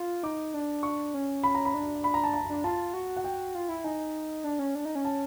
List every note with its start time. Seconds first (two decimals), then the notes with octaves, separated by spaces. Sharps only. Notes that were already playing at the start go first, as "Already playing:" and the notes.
Already playing: F4
0.23 D#4 D6
0.54 D4
0.83 C#6
1.14 C#4
1.44 B5
1.55 A#5
1.65 B5
1.74 D4
2.04 B5
2.14 A#5
2.24 A5
2.33 A#5
2.49 D4
2.64 F4 A5
2.94 F#4
3.17 F#5
3.24 G5
3.55 F4
3.69 E4
3.84 D#4 G#5
4.44 D4
4.59 C#4
4.75 D4
4.85 D#4
4.95 C#4
5.05 A5